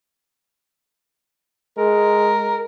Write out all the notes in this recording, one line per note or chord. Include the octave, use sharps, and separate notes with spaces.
G#3 A#4